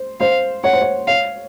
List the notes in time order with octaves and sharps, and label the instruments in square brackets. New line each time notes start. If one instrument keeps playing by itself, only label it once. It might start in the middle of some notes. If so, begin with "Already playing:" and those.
Already playing: [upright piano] C5
[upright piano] C5 [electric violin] F5
[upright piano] C#5 [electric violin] F#5
[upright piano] C5
C#5
[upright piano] C#5 [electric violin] F5